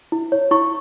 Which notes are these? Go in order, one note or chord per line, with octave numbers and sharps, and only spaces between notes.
E4
C#5
E4 C#6